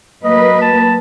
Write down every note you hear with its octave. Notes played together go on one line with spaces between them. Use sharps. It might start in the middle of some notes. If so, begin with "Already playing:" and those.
F#3 A#3 B4 D#5
A5